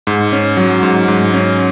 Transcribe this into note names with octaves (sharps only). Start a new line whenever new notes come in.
G#2
C#4
F#3
G#2
G#2
C#4